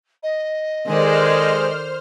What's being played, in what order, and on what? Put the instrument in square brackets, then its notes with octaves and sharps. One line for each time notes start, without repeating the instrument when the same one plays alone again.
[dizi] D#5
[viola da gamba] D#3 A4 D5 [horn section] G#3 [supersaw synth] C5 F6